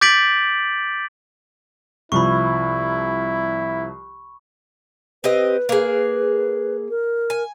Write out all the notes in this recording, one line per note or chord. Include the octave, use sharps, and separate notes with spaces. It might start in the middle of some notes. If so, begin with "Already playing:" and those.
D6 G6 A6 B6 D7 F#7
C2 F3 E4 B5 C#6
C4 G4 B4 D#5
A#3 G#4
A#4
G#5